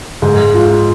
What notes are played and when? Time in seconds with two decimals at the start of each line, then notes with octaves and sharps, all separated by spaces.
0.22 G#2
0.54 F4